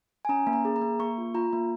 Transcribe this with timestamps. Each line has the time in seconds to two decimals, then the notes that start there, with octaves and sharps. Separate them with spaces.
0.25 G#5
0.29 C#4 A#5
0.47 A#3
0.53 A#5
0.65 G#4
0.76 A#5
0.82 A#3
0.99 A#3 C#6
1.18 F4
1.34 F4 A#5
1.53 A#3